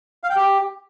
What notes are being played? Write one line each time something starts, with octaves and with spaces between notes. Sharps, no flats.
F5
G5
G4